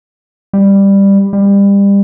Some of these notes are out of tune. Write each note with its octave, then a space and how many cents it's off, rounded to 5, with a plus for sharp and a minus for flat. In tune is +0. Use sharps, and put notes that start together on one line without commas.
G3 +10
G3 +30